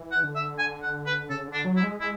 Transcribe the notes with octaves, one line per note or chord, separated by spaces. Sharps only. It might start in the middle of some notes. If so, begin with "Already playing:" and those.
Already playing: E3
F#5
D3
E5
G#5
F#5
B4
C#3 A4
D3
D4
F#3
E4
G#3
G#3 E4